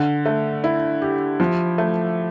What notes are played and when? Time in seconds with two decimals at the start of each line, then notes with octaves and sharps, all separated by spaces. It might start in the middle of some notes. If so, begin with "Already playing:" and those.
Already playing: D3
0.26 A3
0.64 E4
1.02 G4
1.40 F3
1.78 A3